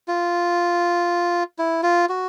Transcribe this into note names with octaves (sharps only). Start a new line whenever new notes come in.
F4
E4
F4
F#4